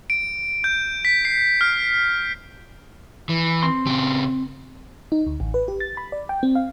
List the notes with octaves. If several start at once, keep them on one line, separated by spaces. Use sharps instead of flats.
D7
G6
B6
C7
F6
E3
C4 C6
C#3 G4
D#4
D2
A1
B4
G4
A6
B5
D5
G5
C4
F5